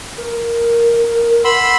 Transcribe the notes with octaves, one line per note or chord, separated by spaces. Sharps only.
A#4
F#5 B5 C6 E6